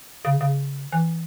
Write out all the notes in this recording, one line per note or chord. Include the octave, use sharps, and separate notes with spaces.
C#3
C#3
E3